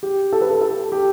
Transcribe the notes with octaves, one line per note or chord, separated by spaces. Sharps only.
G4
A4
B4
A4
A4
G4